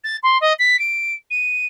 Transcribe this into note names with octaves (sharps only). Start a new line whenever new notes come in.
A6
C6
D#5
B6
D7
D#7